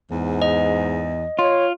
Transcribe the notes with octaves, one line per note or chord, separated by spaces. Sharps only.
E2 G#2
D#5
F4 C#5